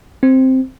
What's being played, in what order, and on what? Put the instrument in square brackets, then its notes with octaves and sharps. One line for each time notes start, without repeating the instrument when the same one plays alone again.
[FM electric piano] C4